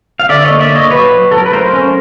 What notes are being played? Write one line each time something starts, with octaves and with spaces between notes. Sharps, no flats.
F5
D3 D5 E5
C#5 D#5
A#3
D5 E5
A#3 C#5 D#5
F#3 B4 C#5
F#3
F#3 A4
A#4
B4
A3 A#4 C5
C#4